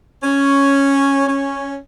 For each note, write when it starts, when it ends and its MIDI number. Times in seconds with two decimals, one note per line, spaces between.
0.23 1.23 61
1.26 1.77 61